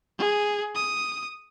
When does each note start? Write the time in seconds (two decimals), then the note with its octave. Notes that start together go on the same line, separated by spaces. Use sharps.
0.19 G#4
0.75 D#6